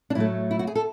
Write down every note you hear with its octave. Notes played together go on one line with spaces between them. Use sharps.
D4
A2 F#3 A3 E4
E4
F#4
G#4
A4